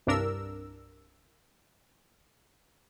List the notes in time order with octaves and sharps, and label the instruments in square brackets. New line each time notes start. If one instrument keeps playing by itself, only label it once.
[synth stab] C2 G2 D4 A#4 E6